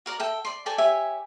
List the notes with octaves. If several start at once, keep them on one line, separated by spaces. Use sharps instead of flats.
F#4 A#4 D5
A4 E5 G5
D5 C6
A4 D5 G5 G#5
G4 C#5 E5 G#5